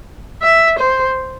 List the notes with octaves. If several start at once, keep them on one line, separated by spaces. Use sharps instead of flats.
E5
C5